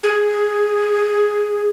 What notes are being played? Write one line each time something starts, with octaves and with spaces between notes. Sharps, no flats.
G#4